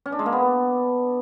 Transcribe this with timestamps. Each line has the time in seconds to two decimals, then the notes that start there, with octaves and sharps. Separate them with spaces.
0.06 C#4
0.12 D4
0.19 G#3
0.26 A#3
0.33 B3